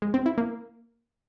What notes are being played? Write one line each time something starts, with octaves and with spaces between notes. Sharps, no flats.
G#3
C4
E4
A#3